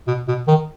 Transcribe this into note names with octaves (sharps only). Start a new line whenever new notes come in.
B2
B2
D#3